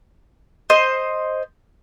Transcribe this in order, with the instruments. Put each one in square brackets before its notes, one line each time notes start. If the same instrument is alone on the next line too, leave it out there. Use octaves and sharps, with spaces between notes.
[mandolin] C5 D#5